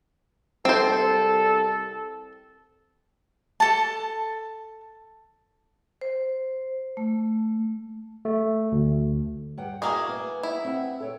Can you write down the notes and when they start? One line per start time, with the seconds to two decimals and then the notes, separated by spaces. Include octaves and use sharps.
0.65 C2 C4 A4 C5
3.60 A4 A5
6.01 C5
6.97 A3
8.25 A3
8.72 D2
9.58 G2 F#5 G5
9.82 A#3 E4 F#4 G#4
10.08 B3
10.43 E4
10.65 C4 E5 F#5
11.00 A4 C#5 G5